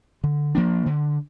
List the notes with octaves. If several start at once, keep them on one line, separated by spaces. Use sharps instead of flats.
D3
F3 A#3 D4
D3